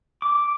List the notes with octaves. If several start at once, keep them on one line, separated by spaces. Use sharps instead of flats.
D6